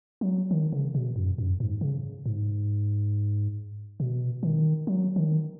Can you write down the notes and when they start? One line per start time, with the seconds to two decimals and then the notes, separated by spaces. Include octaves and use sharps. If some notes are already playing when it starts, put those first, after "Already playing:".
0.21 F#3
0.51 D#3
0.72 C#3
0.95 B2
1.16 F#2
1.38 F#2
1.60 G#2
1.81 C#3
2.26 G#2
4.00 B2
4.43 D#3
4.87 F#3
5.16 D#3